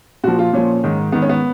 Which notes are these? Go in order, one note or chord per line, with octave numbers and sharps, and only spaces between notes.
A#2 F3 F#4
F4
A#2 F3 C#4
G#2 D#3
G#2 D#3 B3
C#4
B3